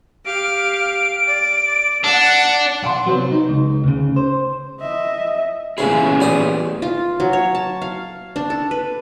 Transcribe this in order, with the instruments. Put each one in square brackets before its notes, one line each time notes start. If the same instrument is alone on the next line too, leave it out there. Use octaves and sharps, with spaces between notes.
[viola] G4 F5 [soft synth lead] D7
[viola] D5
[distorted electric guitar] D4 [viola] F#5
[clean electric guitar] B1 F#5 G5 C6
C3 F#3 B3 C4
D#4
C#2
D2 C#3
C5
[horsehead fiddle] D#5 E5
[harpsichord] A1 C#3 E4 [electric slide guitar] A#2 B3 G#4 [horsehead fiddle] C#4
[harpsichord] A1 D5 D#6
[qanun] F4
F#3
C#5
A5
F5
D4
A4
B4